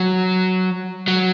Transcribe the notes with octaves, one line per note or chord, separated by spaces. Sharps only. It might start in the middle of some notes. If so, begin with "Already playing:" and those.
Already playing: F#3
F#3